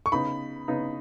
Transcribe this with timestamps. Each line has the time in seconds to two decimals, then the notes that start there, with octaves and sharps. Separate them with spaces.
0.06 C#6
0.12 C#3 B3 D#4 B5
0.68 C#3 B3 D#4